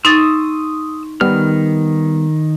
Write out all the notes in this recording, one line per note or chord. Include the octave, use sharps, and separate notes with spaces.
D#4 C6 C#6 D#6 E6 A6
D#3 G3 B3 F6